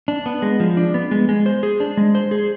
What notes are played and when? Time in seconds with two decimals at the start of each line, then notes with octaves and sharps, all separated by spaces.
0.08 D4
0.26 B3
0.42 G#3
0.60 F3
0.77 D4
0.94 B3
1.11 G#3
1.29 G#3
1.46 C5
1.63 G#4
1.80 D4
1.97 G#3
2.15 C5
2.31 G#4